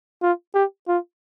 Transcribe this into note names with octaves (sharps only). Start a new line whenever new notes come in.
F4
G4
F4